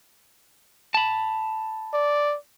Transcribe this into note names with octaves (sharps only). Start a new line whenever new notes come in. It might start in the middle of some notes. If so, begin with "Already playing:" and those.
A5 B5
D5